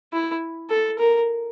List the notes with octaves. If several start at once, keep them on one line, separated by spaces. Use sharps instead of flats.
E4
A4
A#4